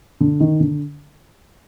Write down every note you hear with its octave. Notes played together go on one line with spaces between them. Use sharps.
D3
D#3
D3